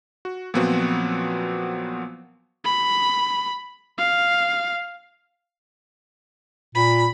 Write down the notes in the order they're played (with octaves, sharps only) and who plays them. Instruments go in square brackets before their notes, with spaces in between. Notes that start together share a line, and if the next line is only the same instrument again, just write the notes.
[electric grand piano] F#4
A#2 F3 F#3 B3 C4 F#4
[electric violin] B5
F5
[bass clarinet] A#2 [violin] B5